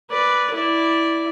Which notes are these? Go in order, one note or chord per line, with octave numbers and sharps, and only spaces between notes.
B4 D5
E4 D5